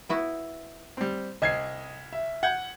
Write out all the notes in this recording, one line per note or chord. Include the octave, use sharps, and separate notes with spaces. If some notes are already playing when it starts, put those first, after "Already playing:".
B3 E4 F#4
G3 C4
C2 D#5 G#6 C7
E5
F#5 G6 G#6